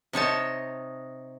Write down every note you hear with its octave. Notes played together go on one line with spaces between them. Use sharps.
C3 D#4 C#5 A5